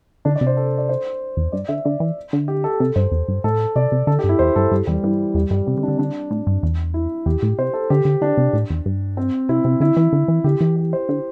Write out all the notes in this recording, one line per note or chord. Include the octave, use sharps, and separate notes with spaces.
D3 D4
D5
C3
C5
A4
D5
C5
E2
G2 D5
D3 E5
D3 D5
E3
D3
G4
A4
C3 A4
G2 C5
E2
G2
A2 A4
C3 D5
C3
D3 A4
G4
G2
E4
E2 C5
G2 A4
G2 G4
E2 G3
G2 E3
E2 G3
G2 G3
C3 C4
D3
D4
D3
D3 D4
A2
G2
E2
E4
E2 G4
A2
C3 C5
A4
D3 G4
D3
D3 D4
C3
A2
E2
G2
C4
C3 E4
C3
D3 E4
E3
D3
E3
D3 G4
E3
G4
C5
D3